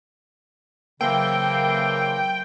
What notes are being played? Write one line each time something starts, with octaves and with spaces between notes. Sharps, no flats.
C#3 E3 F#3 A#3 C4 A4 G5